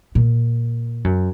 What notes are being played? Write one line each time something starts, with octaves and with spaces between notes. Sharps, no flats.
A#2
F#2